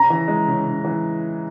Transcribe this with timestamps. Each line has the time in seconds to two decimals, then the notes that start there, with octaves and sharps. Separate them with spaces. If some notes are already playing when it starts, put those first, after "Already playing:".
Already playing: C#3 A#5
0.10 E3
0.28 G#3
0.47 C#3
0.66 C#3
0.84 E3